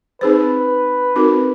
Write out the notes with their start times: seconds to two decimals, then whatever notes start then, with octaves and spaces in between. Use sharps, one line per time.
0.21 C4 D#4 G#4 B4 C5
1.16 C4 D#4 F#4 A#4